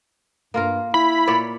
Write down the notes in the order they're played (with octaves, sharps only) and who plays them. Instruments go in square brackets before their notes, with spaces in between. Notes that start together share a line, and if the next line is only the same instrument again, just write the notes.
[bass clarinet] G2 [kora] A#3 F4 A#4
[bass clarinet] E4 [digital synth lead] B5
[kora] A#2 C#5 D5